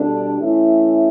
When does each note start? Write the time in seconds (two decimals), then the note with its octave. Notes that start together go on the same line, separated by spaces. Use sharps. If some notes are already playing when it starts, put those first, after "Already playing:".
Already playing: B2 G3 D4 A4
0.40 E3 A3 C#4 E4